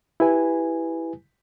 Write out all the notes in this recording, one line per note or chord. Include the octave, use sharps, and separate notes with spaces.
E4 G4 B4 G#5